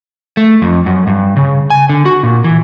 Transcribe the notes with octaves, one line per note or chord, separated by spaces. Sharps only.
A3
F2
F#2
G2
C#3
G#5
D3
F#4
A#2
E3